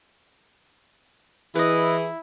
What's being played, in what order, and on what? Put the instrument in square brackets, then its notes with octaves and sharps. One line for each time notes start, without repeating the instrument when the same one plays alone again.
[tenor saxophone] E3 [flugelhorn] E4 [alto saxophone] G#4 [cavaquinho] B4 D#5